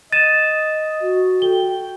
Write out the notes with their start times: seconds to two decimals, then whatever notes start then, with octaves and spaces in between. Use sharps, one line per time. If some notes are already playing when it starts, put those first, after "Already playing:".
0.13 D#5 A6 D#7 E7
1.01 F#4
1.42 A4 G5 G7